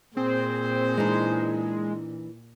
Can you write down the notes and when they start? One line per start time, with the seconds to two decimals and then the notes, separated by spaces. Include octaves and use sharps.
0.17 A#2 C4 G#4 C5
0.97 E3 G#3 D4 D#4